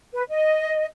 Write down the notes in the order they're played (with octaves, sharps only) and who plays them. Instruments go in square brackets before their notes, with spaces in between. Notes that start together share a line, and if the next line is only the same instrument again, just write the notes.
[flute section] B4
D#5